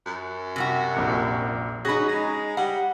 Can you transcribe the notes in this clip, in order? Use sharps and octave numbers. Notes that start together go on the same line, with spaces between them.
F#2
C3 G3 F#4
A#1 F2 C#7
C#4 D#4 F#4 G#4 B5
G#3
G3 F#5